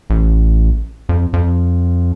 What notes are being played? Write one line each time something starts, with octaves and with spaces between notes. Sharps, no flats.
A1
F2
F2